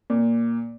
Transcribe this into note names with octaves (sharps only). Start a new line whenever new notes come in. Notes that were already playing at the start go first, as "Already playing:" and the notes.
A#2